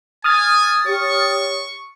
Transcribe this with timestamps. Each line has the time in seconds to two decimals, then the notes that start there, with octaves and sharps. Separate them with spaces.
0.24 G#5 D#6 F6 A6
0.87 G4 C#5 C#6